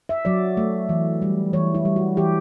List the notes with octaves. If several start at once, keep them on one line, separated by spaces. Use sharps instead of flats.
E5
F#3 D5
A3
E3
G3
E3 C#5
E4
G3
F#4
E3 G4